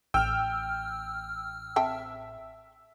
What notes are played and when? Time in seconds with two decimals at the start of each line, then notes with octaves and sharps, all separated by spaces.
0.14 A1 G5 E6 F6
1.76 C4 E5 G5 A5